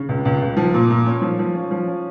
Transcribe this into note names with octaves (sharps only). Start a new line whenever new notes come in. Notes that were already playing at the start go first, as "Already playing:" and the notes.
Already playing: C#3
C#2
C#2
C#2
F3
A#2
A#2
C#4
F3
F3
C#4
F3
C#4